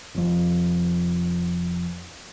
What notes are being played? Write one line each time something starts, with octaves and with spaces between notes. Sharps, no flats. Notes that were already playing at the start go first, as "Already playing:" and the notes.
F1 F2